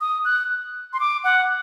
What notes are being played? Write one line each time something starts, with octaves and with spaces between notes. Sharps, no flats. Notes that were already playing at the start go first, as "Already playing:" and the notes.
D#6
F#6
C6
D6
F#5